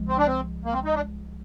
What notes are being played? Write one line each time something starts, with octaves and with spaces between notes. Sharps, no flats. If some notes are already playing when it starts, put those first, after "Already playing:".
Already playing: C2 F3 G#3
C4
D4
C4
A#3
C4
D#4
D4